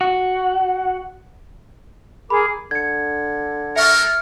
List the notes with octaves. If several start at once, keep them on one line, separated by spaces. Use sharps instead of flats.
F#4
G#4 A#4 B5 D6
D3 G#6 C#7
G3 A4 A#4 E5 C#6 F6 C#7